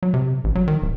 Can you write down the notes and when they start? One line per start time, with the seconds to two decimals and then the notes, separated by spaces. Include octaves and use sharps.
0.03 F#3
0.14 C3
0.44 A1
0.55 F#3
0.68 D#3
0.82 D1